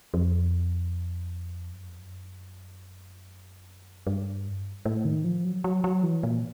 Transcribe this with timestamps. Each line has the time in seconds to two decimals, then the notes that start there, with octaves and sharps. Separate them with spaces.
0.14 F2
1.71 F#2
1.85 F2
1.98 F#2
4.07 G2
4.85 A2
5.05 D#3
5.24 F3
5.45 F#3
5.64 F#3
5.84 F#3
6.03 E3
6.23 A#2